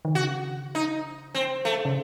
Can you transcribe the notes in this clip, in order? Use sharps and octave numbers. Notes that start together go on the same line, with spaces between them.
D#3
C#3 F#4
D#4
C4
A3
C#3